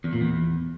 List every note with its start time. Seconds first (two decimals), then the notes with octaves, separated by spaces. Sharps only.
0.04 E2
0.13 A#2
0.21 E2